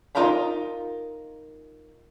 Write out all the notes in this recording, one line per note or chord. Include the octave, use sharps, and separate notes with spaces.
D#4 F4 A#4 A#5 B5